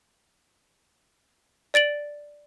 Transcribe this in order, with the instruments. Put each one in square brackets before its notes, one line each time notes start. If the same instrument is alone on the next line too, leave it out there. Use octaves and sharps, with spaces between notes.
[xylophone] D5 A6 D7 F#7